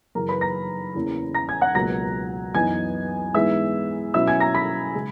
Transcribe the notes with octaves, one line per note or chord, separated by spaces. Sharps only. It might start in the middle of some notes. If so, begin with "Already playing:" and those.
F#2 C#3 E3 A#4 A#5
B4 B5
A#5 A#6
E2 C#3 E3 A#3 C#4
A#5 A#6
G#5 G#6
F#5 F#6
C#2 B2 F#3 A#3 A#5 A#6
F#2 E3 B3 D#4 G#5 G#6
G#2 E3 G#3 B3 E5 E6
B2 F#3 C#4 E4 E5 E6
G#5 G#6
A#5 A#6
B5 B6
C#3 G#3